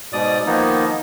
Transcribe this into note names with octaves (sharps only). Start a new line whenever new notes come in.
G#2 B2 D5 D#6
D#3 F3 A#3 B3 D#4